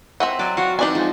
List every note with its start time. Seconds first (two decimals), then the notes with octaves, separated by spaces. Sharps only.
0.20 C4 D#5 E5 F#5
0.39 F#3 D5
0.57 F#3 F#4 F5
0.79 E3 C4 D4 D#4 D5 G#5
0.95 G#2 F3